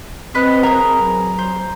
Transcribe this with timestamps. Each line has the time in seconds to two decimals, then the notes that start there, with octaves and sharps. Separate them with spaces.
0.35 C4 B4 D#5 F#6
0.63 G#4 A#4 A#5
0.97 F#3
1.39 C5